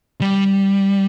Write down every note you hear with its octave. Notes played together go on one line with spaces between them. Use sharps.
G3